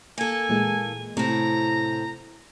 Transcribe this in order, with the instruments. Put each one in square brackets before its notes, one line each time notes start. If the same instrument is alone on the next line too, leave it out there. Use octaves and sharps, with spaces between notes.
[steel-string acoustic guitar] A#3 A4 [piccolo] G#5
[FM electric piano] A#2 E3 G#3
[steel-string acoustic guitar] A2 C4 [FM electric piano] C3 [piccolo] A#5